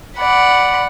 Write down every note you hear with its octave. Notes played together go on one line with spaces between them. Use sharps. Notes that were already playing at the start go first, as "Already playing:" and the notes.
D5 F#5 B5